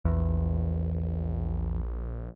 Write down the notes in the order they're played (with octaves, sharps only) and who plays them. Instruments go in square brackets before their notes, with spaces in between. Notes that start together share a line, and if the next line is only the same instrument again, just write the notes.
[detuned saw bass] A#1 [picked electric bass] E2